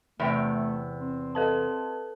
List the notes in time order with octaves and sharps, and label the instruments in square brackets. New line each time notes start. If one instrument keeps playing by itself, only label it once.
[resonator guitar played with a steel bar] E2 C3 G5 [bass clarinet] A3
[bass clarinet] C4
[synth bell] A4 B4 A5